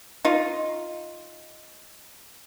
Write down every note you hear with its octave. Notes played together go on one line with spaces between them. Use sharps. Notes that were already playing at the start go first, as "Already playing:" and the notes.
D#4 F4